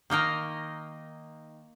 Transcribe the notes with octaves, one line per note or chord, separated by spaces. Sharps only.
D#3 A#3 D#4 A#4